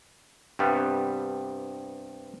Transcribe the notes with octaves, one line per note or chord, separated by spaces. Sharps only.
G2 C3 G3 B3